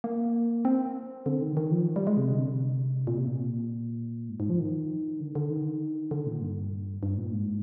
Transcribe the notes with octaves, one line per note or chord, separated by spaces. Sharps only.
A#3
C4
D3
D#3
D#3
F3
G3
G#3
C3
D3
C3
A#2
C3
A#2
G#2
G#2
F3
D#3
D3
D3
D#3
D3
A#2
G2
G2
A#2
G#2